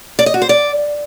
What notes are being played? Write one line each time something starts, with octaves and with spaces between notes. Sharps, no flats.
D5
D#5
F#4
C5
D5